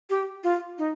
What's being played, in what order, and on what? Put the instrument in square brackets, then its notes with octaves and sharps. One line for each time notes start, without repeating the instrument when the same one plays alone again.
[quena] G4
F4
D#4